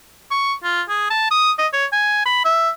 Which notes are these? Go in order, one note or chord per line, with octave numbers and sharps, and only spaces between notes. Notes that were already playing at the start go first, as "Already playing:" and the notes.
C#6
F4
G#4
A5
D#6
D#5
C#5
G#5
B5
E5